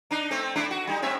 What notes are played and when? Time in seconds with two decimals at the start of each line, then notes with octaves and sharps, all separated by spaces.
0.11 D4 D#4
0.31 A3 C4
0.56 A3 D4 E4
0.71 F#4
0.87 G3 D#4
1.02 A2 C4 E5